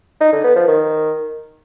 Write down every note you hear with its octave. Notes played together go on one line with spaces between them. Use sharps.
D#4
D3
B3
F3
D#3